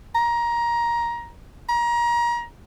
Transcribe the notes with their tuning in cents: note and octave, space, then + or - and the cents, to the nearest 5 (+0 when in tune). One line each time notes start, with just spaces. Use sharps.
A#5 +15
A#5 +30